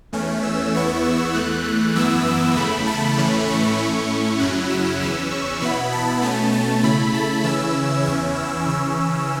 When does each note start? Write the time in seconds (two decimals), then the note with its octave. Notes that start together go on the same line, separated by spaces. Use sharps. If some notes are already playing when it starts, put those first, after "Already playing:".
0.13 E2 E3 A3 C#4
0.43 E6
0.74 E2 E3 B3 E4 C#6
1.04 E6
1.34 E2 E3 A3 F#6
1.65 F#6
1.95 F#2 E3 B3 E4 E6
2.26 E6
2.56 E2 C#3 A3 E4 B5
2.86 A5
3.17 A2 E3 A3 C#4 E4 B5
3.48 C#6
3.78 A2 A3 C#4 E4
4.39 F#2 C#3 F#3 C#4 E4 F#6
4.69 E6
5.00 E2 E3 C#4 E6
5.31 C#6
5.61 B2 B3 E4 B5
5.92 A5
6.22 B2 A3 C#4 A5
6.53 A5
6.83 C#3 A3 E4 B5
7.14 A5
7.43 C#3 E3 C#4 E4 E6
8.04 E2 E3 C#4 E4
8.35 E6
8.66 C#3 E3 C#4 E6